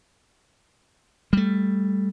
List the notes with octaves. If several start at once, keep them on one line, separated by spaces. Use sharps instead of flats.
G3 A3